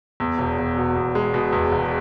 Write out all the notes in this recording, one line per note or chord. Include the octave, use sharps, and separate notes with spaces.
E2
E1
E1
B2
E2
G#3
B2
E2
E1